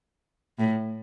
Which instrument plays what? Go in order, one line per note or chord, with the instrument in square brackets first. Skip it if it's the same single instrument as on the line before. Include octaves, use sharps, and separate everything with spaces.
[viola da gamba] A2